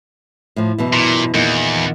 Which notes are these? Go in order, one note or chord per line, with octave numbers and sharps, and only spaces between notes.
A2 F3
F#2 B2 E3
A#2
E2 A#2 D#3